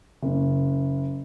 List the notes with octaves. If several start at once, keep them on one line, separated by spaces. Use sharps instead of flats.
F#1